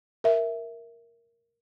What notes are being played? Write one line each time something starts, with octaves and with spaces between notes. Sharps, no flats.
A#4 E5